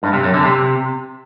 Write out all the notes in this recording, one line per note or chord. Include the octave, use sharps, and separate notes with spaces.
G2
C3
F#2
D3
C3